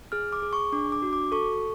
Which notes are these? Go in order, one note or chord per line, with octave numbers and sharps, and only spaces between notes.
G#4 F6
D6
G#4
C#6
D4 D6
D6
F#4
D6
A4 C#6